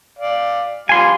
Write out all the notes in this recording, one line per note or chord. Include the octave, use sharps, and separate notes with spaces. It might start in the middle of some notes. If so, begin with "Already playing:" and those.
D5 F5
F3 G3 F5 G#5 C6